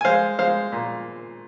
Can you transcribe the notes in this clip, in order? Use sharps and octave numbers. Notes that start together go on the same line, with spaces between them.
G#5
G#3 C5 F5
G#3 C5 F5
A#2